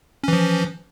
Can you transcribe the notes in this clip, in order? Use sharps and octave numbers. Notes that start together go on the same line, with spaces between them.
E3 F3 C#4